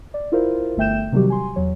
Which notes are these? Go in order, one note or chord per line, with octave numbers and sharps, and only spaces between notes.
D5
E4 F4 A#4 C5
G1 A3 E5 G5 G6 E7
C3 D#3 F#3 G3 F#4 G4
G#5 C6
E2 F#3 C#5